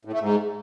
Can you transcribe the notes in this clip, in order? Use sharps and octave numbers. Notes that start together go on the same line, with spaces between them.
A2
A3
G#2